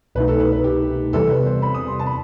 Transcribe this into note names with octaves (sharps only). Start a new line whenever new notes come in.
C2 B2 A3 D#4 B4
A4
B4
B4
G4
E2 C3 E3 G3 A4
B4
C5
B5
D#6
C6
A5
B5